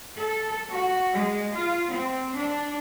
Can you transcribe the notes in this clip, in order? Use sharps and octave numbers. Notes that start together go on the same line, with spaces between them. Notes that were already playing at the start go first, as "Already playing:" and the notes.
A4
F#4
G#3
F4
C4
D4